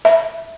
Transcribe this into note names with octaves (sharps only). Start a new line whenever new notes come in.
E5